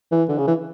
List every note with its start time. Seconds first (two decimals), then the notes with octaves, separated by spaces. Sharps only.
0.11 E3
0.29 D3
0.38 C#3
0.47 E3